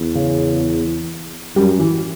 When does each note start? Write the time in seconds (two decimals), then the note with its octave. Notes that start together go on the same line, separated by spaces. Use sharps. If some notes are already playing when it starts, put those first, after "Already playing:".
Already playing: E2
0.15 C#3
1.56 F#2 G3
1.79 E3